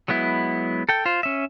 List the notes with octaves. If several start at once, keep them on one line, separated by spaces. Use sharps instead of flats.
F#3 G#3 B3 E4
A4 G5
F4 C5
C#4 E5